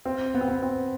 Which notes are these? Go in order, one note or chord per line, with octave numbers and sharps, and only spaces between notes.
C4
B3
C4
B3
C4